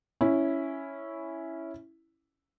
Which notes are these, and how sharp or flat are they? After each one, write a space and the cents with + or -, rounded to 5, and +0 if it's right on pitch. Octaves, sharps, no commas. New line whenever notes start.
C#4 +0 E4 +0